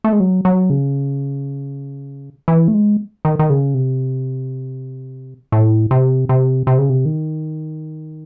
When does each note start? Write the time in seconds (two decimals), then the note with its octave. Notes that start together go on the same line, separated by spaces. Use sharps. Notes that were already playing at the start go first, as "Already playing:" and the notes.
0.04 A3
0.13 G#3
0.20 F#3
0.45 F#3
0.70 C#3
2.48 E3
2.68 A3
2.74 G#3
3.25 D#3
3.39 D#3
3.50 C#3
3.74 C3
5.52 A2
5.91 C3
6.29 C3
6.67 C3
6.78 C#3
6.89 C3
7.05 D#3